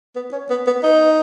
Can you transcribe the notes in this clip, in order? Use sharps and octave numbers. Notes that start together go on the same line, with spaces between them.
B3
C#4
B3
B3
D#4